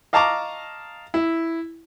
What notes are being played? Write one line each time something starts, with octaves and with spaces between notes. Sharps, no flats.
D#5 F5 A5 A#5 C#6 D6
E4